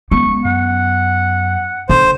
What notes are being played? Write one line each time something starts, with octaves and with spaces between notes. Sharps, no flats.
G#3 B3 C#4 C#6
F#2 F#5
D3 C5